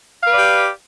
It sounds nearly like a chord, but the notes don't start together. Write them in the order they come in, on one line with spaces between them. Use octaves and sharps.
F5 B4 D5 G4